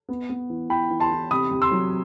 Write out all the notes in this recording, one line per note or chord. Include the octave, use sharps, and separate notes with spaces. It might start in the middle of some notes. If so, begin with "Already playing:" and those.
B3
B3
E3
E3 G5 B5
E3
A5 C6
E3
C3 B5 D#6
C3
C6 E6
F#3